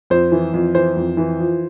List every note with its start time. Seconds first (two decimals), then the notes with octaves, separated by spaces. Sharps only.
0.10 F2 C5
0.32 E3
0.54 F2
0.75 E3 C5
0.96 F2
1.17 E3
1.39 F3